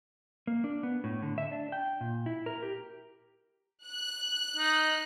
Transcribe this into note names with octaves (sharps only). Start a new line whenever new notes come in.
A#3
D4
B3
A2
D3
E5
D4
G5
A#2
E4
A#4
G4
F#6
D#4